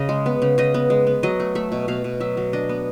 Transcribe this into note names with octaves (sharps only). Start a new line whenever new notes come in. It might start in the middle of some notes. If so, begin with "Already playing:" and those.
Already playing: C#3 D#5
G#3
B3
C#3
C#3 D#5
B3
G#3
B3
F#3 D#5
A3
A3 E5
B2
B2 F5
B2
F#3 E5
F#3
D4 D#5
B3